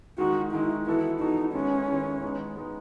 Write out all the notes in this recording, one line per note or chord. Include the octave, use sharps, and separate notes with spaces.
D#3 G#3 D#4 F#4
D#3 G#3 D#4 E4
E3 B3 E4 F#4 A4
E3 B3 D#4 F#4 A4
D#3 G#3 B3 C#4 E4
D#3 G#3 B3 E4
G#3 B3 D#4
G#3 B3 D#4